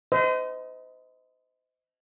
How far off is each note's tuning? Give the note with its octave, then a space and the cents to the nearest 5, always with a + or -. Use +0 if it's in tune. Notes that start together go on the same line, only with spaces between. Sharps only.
C5 -35 D#5 +20